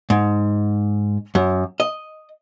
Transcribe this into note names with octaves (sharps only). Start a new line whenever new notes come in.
G#2
F#2
D#5